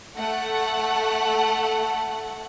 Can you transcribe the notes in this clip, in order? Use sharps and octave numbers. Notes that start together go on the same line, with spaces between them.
A3 F#5